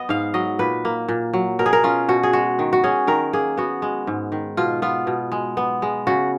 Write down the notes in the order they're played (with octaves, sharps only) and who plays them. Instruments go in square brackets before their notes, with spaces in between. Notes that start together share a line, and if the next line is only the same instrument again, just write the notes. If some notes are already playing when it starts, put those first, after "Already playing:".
Already playing: [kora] B3 D#5
G#2 F5
F#3 D#5
A#2 B4
A#3
A#2
F#3
B2 A#4
G#4
A#4
C#4 F4
B2 F#4
G#4
G#3 F#4
D#3
F#4
C#4 G#4
D#3 A#4
A#3 G#4
B3 F#4
G#3
G#2
D#3
B2 F4
B3 F4
B2
G#3
B3
G#3
C#3 F#4